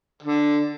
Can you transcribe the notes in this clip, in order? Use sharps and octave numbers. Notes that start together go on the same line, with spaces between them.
D3